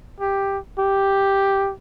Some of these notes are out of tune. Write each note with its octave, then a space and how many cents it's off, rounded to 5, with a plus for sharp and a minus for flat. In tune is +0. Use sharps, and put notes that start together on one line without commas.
G4 +5
G4 +0